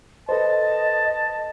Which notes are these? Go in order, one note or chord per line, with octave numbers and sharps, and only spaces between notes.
A4 B4 C5 D#5 A5